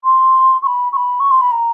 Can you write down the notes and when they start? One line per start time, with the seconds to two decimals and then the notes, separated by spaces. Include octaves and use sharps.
0.04 C6
0.62 C#6
0.66 B5
0.92 C#6
0.96 B5
1.20 C#6
1.31 C6
1.41 B5
1.51 A#5